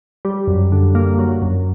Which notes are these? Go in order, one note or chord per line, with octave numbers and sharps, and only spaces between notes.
G3
F#2
D3
A#3
F#3
F#2